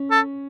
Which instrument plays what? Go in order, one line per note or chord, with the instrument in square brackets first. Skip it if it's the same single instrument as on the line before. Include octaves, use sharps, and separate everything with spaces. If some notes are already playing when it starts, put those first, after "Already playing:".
Already playing: [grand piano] C#4
[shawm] A4